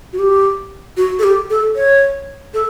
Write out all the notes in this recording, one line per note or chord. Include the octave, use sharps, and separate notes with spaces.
F#4
G4
F#4
A4
G4
A4
C#5
A4